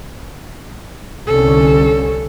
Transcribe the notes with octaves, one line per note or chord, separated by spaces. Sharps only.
C2 D3 C#4 A4